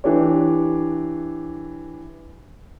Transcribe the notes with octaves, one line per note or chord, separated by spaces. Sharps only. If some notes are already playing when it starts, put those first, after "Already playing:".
E3 D4 G4 C#5